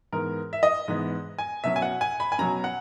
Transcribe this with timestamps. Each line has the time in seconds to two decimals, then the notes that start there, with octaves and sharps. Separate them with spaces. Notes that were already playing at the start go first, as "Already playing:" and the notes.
0.12 G#2 E3 B3 A#4
0.53 E5
0.63 D#5
0.88 G#2 E3 B3
1.39 G#5
1.64 B2 F#3 C#4 E5
1.76 G#5
1.82 F#5
2.01 G#5
2.20 B5
2.32 G#5
2.39 B2 F#3 C#4 A#5
2.64 F#5